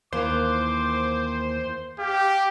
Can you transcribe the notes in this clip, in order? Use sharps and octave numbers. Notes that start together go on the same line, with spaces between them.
D#2 E3 A#3 C5 D6
G4 F5